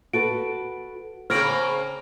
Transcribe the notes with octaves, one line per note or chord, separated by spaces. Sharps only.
F#4 A4 B4 D7
C#3 A#3 C4 C#5 F6 A#6 D7